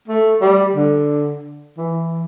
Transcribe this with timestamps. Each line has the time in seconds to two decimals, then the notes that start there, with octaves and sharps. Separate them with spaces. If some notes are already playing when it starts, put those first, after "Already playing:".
0.08 A3
0.42 G3
0.75 D3
1.77 E3